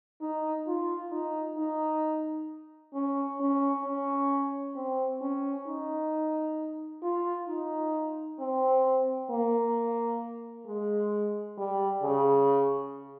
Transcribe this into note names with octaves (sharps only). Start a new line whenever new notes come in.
D#4
F4
D#4
D#4
C#4
C#4
C#4
C4
C#4
D#4
F4
D#4
C4
A#3
G#3
G3
C#3